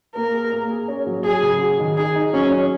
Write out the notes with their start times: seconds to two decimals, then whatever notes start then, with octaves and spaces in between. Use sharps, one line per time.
0.16 A#3 A#4
0.33 G#4
0.52 A#3
0.70 G#4
0.88 C#4
1.07 F#3
1.24 F#3 G#4
1.43 C#3
1.61 F#4
1.79 D#3
1.97 D#4 G#4
2.16 D#4
2.33 F#3 C#4
2.51 C#4